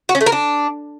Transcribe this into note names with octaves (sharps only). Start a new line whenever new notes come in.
F#4
C#4
A3
A#4
D4